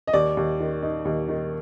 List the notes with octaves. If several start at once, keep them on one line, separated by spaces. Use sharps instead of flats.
D#5
D#2 D5
D#2
D#3
D#4
D#2
D#3